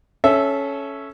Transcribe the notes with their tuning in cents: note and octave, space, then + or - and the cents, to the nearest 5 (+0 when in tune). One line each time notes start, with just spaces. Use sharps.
C#4 +0 A4 -20 E5 +0